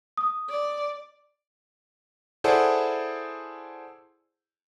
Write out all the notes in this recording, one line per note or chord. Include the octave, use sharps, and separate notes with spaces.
D#6
D5
E4 G#4 A4 C5 D5 F#5